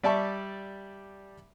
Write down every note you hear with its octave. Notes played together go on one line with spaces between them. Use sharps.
G3 D5 E5 A5 C#6